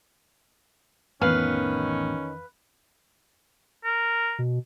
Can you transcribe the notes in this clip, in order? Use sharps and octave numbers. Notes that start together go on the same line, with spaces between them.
A1 F2 D#3 E3 B3 C#4 B4 F5
A#4
B2